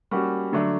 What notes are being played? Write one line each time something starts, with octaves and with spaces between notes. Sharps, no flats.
G3 A#3 C#4 F#4
D3 F#3 A3 D4